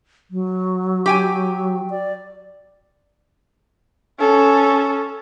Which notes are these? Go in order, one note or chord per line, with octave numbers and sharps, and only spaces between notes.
F#3
G4 G5 G#5
D5
C#4 A4